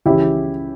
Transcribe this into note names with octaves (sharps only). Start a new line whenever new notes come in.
C#2 C#3 E3 E4 G4